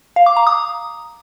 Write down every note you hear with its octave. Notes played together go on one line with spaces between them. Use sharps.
F5
D6
A#5
D#6